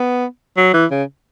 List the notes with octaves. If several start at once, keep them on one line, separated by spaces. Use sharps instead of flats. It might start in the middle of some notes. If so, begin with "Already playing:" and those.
Already playing: B3
F#3
E3
C#3